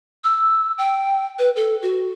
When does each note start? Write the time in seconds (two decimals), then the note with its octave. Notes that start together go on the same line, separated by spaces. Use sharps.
0.24 E6
0.78 G5
1.39 B4
1.56 A4
1.82 F#4